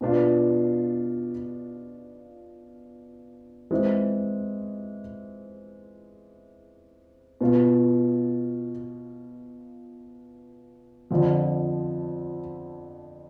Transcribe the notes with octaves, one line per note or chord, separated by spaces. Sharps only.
B2 B3 D4 F4
E3 G#3 C4 E4
B2 B3 F4
F2 D3 F3